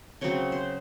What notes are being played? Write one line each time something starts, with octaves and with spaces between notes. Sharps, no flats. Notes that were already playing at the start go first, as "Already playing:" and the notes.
C#3 F#3 C4 C#5
C5